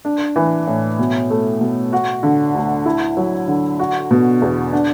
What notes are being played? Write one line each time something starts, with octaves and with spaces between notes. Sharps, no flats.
D4
E3
A2
B2
A3
B2
F#4
D3
D2
E4
F#3
D3
F#4
B2
E2
D4